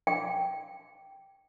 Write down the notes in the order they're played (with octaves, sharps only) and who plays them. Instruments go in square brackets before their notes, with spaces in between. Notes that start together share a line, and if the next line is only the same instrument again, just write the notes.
[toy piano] G5